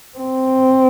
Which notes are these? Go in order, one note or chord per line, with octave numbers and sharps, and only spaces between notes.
C4